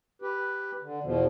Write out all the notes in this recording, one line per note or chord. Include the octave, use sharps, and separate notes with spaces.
G4 B4
D3
E2 B2 F3